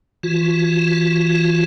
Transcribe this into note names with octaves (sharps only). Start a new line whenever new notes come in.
E3 F4 F#4